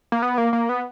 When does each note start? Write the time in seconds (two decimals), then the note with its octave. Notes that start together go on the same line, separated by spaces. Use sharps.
0.12 A#3
0.22 B3
0.38 A#3
0.53 A#3
0.69 B3